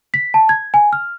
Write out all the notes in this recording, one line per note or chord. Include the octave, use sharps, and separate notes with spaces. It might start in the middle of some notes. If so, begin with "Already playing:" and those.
B6
A5
G#6
G#5
F6